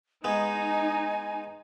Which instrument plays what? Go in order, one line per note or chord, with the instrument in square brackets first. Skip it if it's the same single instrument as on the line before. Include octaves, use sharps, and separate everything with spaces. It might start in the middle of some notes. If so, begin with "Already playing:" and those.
[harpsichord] G#3 B3 [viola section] D#4 [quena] G#5